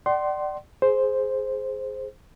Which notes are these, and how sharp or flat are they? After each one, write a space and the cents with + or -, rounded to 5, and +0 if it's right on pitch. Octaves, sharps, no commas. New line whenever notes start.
D5 +15 F#5 +45 C6 +0
G#4 +10 C5 +0